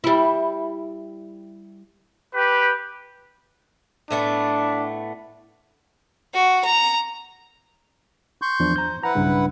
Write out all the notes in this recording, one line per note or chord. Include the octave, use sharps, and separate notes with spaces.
G3 E4
G4 B4
A2 A3 B3 D4
F#4
A#5
C6 C#6 G6
E2 F3 D4
C5 A#5 G6
E4 B4 F#5 A#5
B1 G2 C#3